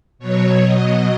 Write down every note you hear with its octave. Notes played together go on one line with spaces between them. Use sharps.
B2 F#3 C#5
B2 F#3 D#5